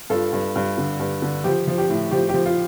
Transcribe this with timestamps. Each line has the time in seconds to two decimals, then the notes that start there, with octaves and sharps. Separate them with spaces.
0.10 G2 F4 A4
0.33 G2
0.56 G2
0.78 D3
1.00 G2
1.22 D3
1.44 F3 G4
1.67 F3
1.78 G4
1.90 A2
2.11 F3 G4
2.29 G4
2.34 F3
2.46 F4